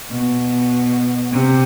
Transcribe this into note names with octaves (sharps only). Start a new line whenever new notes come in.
B2
C3